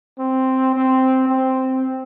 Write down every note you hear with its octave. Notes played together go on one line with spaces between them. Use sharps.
C4
C4
C4